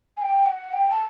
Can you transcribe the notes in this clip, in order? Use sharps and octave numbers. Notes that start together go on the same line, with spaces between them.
G#5
G5
F#5
G5
A5